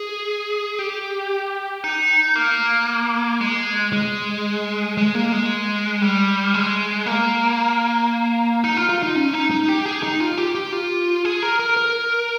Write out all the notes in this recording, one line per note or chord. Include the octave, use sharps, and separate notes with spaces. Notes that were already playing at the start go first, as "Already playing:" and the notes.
Already playing: G#4
G4
D#4
A#3
G#3
G#3
G#3
A#3
G#3
G3
G#3
A#3
D#4
F4
F4
D#4
C#4
D#4
D#4
G4
G#4
D#4
F4
G4
G4
F4
G#4
A#4
A#4
A#4